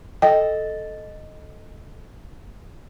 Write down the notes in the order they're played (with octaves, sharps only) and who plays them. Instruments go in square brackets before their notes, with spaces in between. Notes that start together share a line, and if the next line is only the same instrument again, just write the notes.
[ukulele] A4 D#5 [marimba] G5